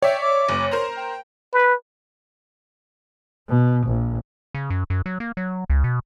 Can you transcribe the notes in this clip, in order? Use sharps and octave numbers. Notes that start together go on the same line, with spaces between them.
C#5 D5 E5 G5
D6
F#1
A#4 C5 A#5 C6
G5
B4
B2
A#1
C#3
F#2
F#2
F#3
A#3
F#3
C#2
B2